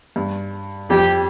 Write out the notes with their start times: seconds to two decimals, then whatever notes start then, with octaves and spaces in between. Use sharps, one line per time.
0.16 G2
0.90 F2 G4